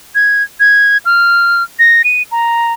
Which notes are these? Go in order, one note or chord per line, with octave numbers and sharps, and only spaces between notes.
G#6
G#6
F6
A#6
D#7
A#5